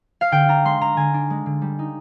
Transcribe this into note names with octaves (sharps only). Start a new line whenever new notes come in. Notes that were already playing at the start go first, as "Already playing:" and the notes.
F5
D3 G5
D4 A#5
G#3 C6
D3 A#5
D3 G#5
D4
G#3
D3
G3
D#4